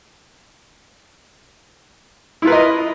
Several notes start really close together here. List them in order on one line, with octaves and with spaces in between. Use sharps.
E4 F4 B4 A#4 D#5